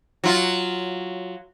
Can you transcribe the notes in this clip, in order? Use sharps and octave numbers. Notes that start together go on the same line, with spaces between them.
F#3 F4